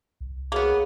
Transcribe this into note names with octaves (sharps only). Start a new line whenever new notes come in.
C2
A#3 B3 F#4 G#4 C#5